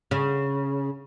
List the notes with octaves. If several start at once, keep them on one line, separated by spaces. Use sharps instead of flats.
C#3